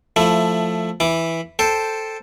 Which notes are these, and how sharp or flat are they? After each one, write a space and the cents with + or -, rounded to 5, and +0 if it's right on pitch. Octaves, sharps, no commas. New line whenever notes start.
F3 +0 A3 +0 E4 +15
E3 +0 E4 +0 D6 +0
A4 +0 C5 +0 G5 +0